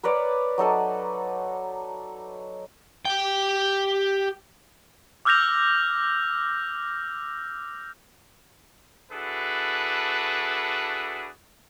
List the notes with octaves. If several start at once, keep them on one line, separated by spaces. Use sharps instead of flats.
A#4 B4 C#5 D5
F#3 D#4 A4 D5
G4 G5
D6 E6 F6 G6 A#6 F7
D4 E4 F#4 G#4 A4 B4